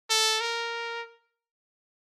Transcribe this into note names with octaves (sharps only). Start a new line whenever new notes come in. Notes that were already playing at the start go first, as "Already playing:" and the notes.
A4
A#4